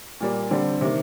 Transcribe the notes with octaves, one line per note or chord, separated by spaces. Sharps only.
A#2 G3 A#3
D3 G3 C4
C3 D#3 A#3